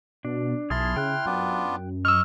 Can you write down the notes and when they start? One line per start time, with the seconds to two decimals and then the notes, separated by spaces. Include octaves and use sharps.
0.25 B2 D4
0.70 B1 E4 G#4 A5 B5 C6 F6
0.97 C#3 G5 F#6
1.26 F#2 B3 D4 F4
2.05 D#5 C#6 E6 F6